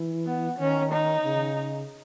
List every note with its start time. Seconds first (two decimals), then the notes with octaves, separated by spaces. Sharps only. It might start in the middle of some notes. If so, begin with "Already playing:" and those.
Already playing: E3
0.26 B3
0.58 D#3 C#4
0.92 D#4
1.24 C#3